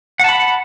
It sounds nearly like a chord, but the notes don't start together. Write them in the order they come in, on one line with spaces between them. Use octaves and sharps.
F#5 A5 B5